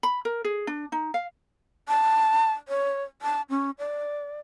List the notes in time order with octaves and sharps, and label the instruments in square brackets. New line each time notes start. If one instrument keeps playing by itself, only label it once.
[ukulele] B5
A#4
G#4
D4
D#4
F5
[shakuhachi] A5
C#5
A5
C#4
D5